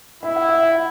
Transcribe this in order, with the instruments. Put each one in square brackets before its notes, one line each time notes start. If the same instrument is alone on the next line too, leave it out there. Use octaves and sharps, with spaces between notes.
[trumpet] E4 [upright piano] E5
[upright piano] F#5
E5
F#5
E5